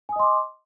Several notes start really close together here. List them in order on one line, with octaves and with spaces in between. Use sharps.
G#5 D#6 D#5 C6 D6